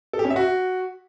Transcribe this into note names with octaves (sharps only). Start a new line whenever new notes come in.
A4
G4
C#4
E5
F#4